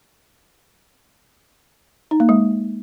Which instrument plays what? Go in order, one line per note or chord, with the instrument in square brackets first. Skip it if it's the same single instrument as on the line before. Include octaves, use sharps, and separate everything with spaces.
[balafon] D#4
A#3
G#3